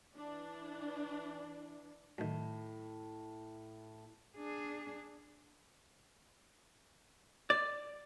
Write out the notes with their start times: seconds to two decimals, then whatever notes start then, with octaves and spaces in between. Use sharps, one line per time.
0.15 E3 D4
2.18 A2 D#3 F#3
4.37 D4 G#4
7.50 D5